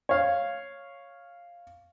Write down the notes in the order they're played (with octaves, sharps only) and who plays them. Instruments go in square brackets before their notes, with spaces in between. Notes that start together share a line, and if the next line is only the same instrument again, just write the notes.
[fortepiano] C#5 F5